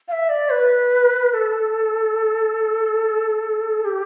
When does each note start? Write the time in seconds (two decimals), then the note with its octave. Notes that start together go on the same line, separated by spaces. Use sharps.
0.08 F5
0.12 E5
0.29 D5
0.50 B4
1.33 A4
3.84 G4